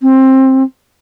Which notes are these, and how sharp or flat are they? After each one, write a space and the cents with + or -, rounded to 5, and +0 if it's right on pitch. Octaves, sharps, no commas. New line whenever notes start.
C4 +15